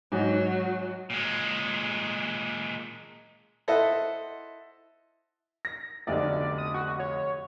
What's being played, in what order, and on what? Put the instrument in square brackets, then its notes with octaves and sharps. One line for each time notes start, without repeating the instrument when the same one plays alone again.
[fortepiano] G#2 [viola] F#3
[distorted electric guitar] A#2 G#3
[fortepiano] E4 A4 C5 D#5 E5 F#5
[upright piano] A#6
[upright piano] F1 B1 D3 [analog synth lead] D5
[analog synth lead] D#6
F#4
C#5